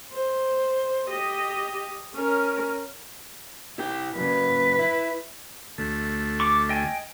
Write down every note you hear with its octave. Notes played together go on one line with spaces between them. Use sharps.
C5
G4 D#5
C#4 A#4
E4 G4 G5
F#2 C#3 B4
E4
D2 A3
C#6 D6
D#5 G5 G#5